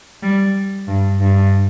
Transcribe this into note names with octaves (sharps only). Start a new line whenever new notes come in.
G3
G2
G2